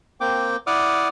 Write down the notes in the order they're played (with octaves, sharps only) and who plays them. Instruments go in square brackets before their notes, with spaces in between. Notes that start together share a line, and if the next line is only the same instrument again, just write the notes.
[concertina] A#3 C4 G5 D6
E4 D5 F#5 D6 D#6 F6